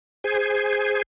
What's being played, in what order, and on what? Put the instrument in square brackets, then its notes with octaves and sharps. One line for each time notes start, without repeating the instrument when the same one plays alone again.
[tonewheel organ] G#4 C5 G#5